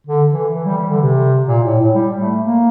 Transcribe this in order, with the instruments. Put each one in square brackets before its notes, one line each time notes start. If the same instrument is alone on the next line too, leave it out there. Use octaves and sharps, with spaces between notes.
[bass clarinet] D3
E3
E3
G3
E3
D3
C3
A#2
A2
A2
G3
A3
A#3